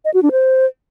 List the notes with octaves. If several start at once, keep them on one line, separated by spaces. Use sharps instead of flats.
D#5
F#4
D4
C5